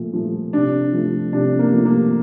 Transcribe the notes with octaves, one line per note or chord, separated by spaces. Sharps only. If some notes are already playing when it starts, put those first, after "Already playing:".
Already playing: A#2 F3 A3
F3 A3
C3 D4
F3 A3
C3 D4
A#3
F3 A3
A#3